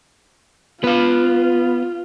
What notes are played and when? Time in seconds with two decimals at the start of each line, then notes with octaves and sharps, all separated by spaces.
0.84 B3 F4 B4 F5